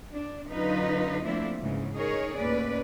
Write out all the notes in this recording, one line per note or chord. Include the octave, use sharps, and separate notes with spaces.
D4
F#2 D3 F#3 D#4 F4 B4
F3 A3 A#3 C4 D4 E4
D2 G#2 C#3 E3
D#4 G#4 A#4 C#5
D#2 A2 C#4 B4 D5